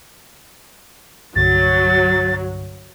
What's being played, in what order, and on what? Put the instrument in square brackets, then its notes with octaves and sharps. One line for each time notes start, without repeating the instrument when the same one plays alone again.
[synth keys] C2 G2 D3 [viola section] F#3 [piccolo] A6